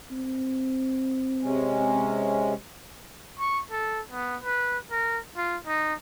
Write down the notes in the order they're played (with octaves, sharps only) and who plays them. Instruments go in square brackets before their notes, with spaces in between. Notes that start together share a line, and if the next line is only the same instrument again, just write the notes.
[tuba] C4
[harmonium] C3 G#3 C#4
[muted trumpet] C#6
A4
B3
B4
A#4
F4
D#4